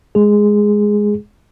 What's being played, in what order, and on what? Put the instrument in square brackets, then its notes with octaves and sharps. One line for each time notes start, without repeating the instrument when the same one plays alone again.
[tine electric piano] G#3 G#4